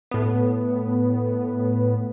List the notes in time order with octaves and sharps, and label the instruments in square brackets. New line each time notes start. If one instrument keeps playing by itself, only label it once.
[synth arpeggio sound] A2 B3